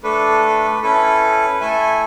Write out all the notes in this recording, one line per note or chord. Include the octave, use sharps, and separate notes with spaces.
A3 D4 A4 B4
C#4 E4 A4 B4
A3 E4 A4 E5 G#5